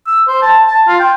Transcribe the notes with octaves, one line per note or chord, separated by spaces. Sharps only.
E6
C5
A5
A5
F4
G5